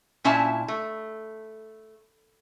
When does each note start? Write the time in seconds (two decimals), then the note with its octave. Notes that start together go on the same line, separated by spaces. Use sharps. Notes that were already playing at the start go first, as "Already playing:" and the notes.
0.24 A#2 C#4 E4 E5 A5
0.68 A3